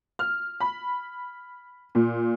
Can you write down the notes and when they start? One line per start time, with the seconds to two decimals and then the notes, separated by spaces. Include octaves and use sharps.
0.19 F6
0.60 B5
1.95 A#2